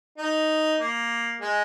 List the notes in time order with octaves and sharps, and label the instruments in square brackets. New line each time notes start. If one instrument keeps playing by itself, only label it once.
[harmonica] D#4
A#3
G#3